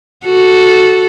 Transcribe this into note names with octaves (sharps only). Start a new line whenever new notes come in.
F#4 A4